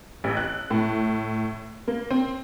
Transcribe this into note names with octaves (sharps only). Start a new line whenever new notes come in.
A1
F#6
A2
A#3
C4